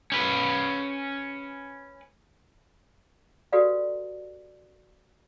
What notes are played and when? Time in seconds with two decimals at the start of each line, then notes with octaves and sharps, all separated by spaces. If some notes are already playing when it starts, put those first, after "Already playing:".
0.12 C#4 B4
3.52 F#4 G4 A4 B4 D5 F5